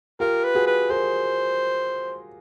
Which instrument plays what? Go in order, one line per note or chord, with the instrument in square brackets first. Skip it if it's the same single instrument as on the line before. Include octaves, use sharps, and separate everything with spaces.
[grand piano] F4 G4 [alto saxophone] A#4
[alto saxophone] B4
[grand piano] F#4 G#4
[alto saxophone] B4
[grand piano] G#4 A#4 [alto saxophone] C5